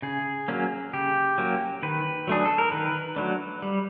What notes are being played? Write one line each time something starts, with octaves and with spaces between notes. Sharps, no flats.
C#3 G#4
F#3 A#3 C#4
C#3 G4
F#3 A#3 C#4
D#3 B4
F#3 A3 D4 G#4
A4
A#4
D#3 B4
F#3 A3 D4
G3